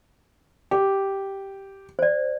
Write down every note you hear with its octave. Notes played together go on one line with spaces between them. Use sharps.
G4
C5 D5